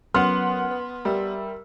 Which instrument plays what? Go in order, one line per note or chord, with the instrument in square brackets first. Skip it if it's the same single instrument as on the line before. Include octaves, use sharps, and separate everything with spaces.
[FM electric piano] F#3 C#4 A#4 [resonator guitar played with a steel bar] B3 [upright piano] F#5 F6 [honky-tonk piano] C6
[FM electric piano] B4
[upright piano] G3 [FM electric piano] A#4 E5 E6